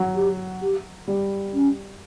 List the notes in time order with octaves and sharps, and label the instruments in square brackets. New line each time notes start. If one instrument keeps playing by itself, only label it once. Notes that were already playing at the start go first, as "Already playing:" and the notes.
Already playing: [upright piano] F#3
[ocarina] G4
G4
[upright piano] G3
[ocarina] C#4